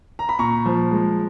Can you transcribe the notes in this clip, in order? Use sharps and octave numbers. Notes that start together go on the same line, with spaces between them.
A#5
B5
A#2 A#5 C#6
F3
G#3